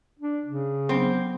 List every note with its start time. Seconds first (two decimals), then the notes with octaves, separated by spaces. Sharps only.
0.19 D4
0.45 C#3
0.89 F#3 B3 C4 D4